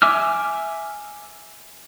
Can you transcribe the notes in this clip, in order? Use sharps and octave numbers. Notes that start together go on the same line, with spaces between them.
E5 G#5 D6 E6 F6